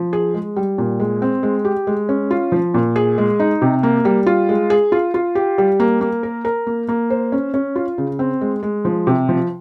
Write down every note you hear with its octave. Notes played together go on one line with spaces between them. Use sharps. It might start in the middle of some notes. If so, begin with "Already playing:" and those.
Already playing: F3
G#4
G#3
G3
A#2
G#3
C4
G#3
G4
G#3
C#4
F4
F3
A#2
G#4
G#3
D#4
C3
A#3
G3
F4
G#3
G#4
F4
F4
G4
G3
A#3
A#3
A#4
A#4
A#3
A#3
C5
C#4
C#4
F4
C#3
C4
G#3
G#3
F3
C3
F3